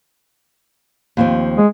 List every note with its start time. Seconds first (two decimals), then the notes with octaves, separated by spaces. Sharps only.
1.17 D#2 F3 C4
1.57 G#3